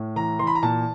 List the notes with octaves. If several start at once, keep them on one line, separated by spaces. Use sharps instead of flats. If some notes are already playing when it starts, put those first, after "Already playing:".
Already playing: A2
E3 A#5
E3 C6
B5
A#5
A#2 A5